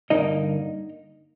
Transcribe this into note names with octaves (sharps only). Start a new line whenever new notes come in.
G2 D3 F#3 A#3 D#4 D#5